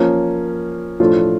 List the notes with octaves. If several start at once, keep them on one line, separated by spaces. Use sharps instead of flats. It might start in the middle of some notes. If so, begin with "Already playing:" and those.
Already playing: F3 A#3 C#4
A2 F3 A3 D4 F4